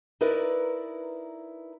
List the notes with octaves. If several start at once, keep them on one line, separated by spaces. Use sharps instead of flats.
D#4 E4 A#4 B4 D5